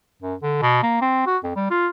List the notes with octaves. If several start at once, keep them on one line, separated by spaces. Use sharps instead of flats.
F#2
D3
B2
A#3
C4
F#4
F2
G3
F4